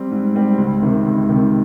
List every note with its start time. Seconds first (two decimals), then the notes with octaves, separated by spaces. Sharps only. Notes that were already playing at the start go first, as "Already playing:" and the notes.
Already playing: G3 C4
0.11 G#2
0.35 G3 C4
0.58 C#2
0.82 C3 D#3
1.05 C#2
1.29 C3 D#3